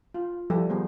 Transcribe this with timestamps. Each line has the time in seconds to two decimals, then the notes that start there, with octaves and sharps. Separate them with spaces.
0.15 F4
0.50 F3 G3 E4 G4 A4 B4
0.70 D#3 G3 B3 G#4 C5